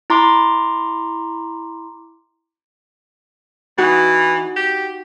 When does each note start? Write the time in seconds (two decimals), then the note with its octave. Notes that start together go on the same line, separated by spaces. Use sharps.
0.10 E4 A#5 C6 D6
3.78 E3 D#4 F#4
4.56 G4